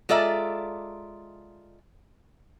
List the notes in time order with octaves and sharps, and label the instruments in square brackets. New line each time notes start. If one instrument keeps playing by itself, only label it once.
[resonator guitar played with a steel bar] G#3 F4 A4 D5 E5 A#5